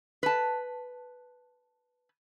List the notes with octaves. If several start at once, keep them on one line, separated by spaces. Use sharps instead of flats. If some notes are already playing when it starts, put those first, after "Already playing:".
B4 A5